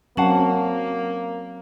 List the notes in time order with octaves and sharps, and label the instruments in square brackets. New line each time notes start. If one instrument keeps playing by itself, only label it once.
[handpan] F#3 C4 [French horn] A#3 [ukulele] C#4 F5 F#5 [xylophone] A5 F#7